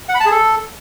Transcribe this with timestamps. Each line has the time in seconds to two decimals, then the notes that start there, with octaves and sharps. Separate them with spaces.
0.09 F#5
0.15 B5
0.20 A5
0.26 G#4
0.31 A4